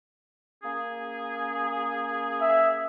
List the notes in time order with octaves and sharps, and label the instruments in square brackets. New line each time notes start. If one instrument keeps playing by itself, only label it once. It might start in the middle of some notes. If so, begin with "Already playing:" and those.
[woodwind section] A#3 C#4 G#4
[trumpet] E5